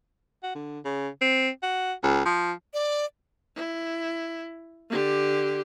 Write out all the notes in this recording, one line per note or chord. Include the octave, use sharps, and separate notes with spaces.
F#4
D3
C#3
C4
F#4
C#2
F3
D5
E4
D3 G4